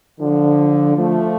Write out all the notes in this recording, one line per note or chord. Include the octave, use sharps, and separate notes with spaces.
D3 F3
F3 A3